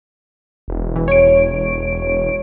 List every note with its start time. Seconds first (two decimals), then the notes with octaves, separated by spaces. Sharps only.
0.68 E1
0.96 E3
1.08 C#5 D7